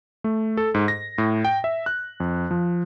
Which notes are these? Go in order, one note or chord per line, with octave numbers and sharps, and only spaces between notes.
A3
A4
G#2
A#6
A2
G5
E5
F#6
F2
F3